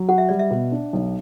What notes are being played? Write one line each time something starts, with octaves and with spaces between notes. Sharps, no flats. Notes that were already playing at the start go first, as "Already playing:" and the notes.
Already playing: F#3
F#4 F#5
E5
G3 D5
E5
B2
D4
B1